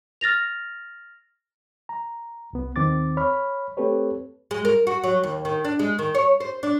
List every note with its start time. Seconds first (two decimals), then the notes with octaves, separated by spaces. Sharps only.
0.21 F6 A6 A#6 F7
1.89 A#5
2.53 C2 B3
2.76 D#2 D#3 C4 D6 A6
3.17 C#5 B5 F6
3.77 A3 C4 G4 A4 B4 C#5
4.51 G#3
4.65 A#4
4.87 F#4
5.04 F#3
5.23 D#2
5.45 D#3
5.65 D4
5.79 G#3
5.99 D#3
6.15 C#5
6.40 C5
6.63 D4